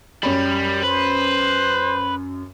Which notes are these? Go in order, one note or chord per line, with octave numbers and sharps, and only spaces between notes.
F#2 G3 C#5 B5
B4 C5